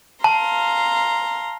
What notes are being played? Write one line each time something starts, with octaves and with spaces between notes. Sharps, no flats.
F5 A5 A#5 C6